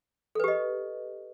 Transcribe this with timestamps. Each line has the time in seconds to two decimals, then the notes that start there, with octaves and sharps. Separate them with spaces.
0.35 A4
0.40 B4
0.44 G4
0.48 D#5